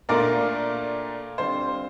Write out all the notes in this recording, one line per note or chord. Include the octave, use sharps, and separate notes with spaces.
A#2 A3 D4 F4 A#4 D5
D3 G3 C4 F4 C5